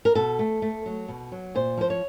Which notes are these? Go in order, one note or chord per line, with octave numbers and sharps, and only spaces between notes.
A#4
B2 A4
A3
A3
F#3
B2
F#3
A#2 C5
F3 C5
C#5